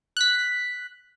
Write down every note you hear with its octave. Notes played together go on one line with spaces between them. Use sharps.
F#6 B6